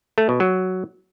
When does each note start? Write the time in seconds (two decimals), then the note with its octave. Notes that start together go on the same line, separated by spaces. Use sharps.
0.18 A3
0.29 B2
0.40 F#3